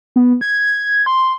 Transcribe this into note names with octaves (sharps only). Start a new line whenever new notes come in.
B3
G#6
C6